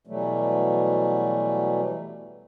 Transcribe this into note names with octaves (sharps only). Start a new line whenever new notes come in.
B2 E3 F#3 G3 A3